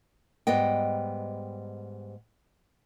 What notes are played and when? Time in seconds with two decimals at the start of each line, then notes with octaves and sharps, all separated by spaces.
0.47 G#2 G3 B3 D#5 G5